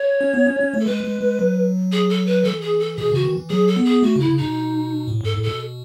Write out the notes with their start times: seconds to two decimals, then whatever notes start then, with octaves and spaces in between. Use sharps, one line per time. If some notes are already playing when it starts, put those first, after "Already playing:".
Already playing: C#5
0.21 C#4
0.34 B3
0.46 C#4
0.60 C#4
0.74 A3
0.80 A4
0.86 G#3 B4
1.04 G#3
1.21 G#3
1.39 F#3
1.92 G#4
2.09 A4
2.27 B4
2.44 E3 A4
2.61 G#4
2.80 A4
2.97 B2 G#4
3.11 C#3 F#4
3.24 D#3
3.37 E3
3.49 F#3 G#4
3.68 A4
3.76 B3
3.85 G#4
4.03 A3 F#4
4.16 C#3 E4
4.29 C#3
4.38 B2 D#4
5.07 A2
5.21 G#2 A4
5.34 A2
5.43 B2 A4